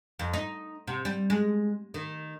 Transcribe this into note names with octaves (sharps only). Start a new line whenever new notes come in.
F2
D#4
C3
G3
G#3
D#3